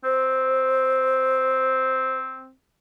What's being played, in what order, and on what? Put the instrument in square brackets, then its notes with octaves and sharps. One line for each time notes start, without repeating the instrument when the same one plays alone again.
[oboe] C4 [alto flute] C5